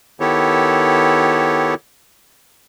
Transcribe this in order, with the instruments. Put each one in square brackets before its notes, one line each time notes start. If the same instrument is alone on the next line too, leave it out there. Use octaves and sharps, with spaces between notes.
[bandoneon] D#3 B3 E4 G4 A4 C#5